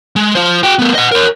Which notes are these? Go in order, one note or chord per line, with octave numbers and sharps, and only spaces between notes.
G#3
F4 C5
F#4 G5
A3 B3
D#5 F#5
A#4 C#5